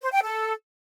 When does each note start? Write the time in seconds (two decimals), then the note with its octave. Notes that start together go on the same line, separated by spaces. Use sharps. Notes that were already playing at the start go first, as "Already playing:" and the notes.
0.02 C5
0.12 G5
0.23 A4